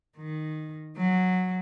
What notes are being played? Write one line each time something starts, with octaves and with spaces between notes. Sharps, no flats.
D#3
F#3